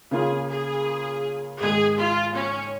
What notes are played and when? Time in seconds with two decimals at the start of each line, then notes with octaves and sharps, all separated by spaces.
0.11 C#3 A#3 F4 G#4
0.49 G#4
1.61 G#2 D#3 G#3 G#4
1.98 F4
2.35 C#4